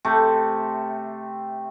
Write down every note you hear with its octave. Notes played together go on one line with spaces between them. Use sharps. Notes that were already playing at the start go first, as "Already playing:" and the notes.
C3 A3